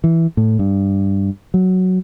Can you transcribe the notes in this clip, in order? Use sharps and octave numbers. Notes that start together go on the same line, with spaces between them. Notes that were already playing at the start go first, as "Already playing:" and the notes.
E3
A2
G2
F#3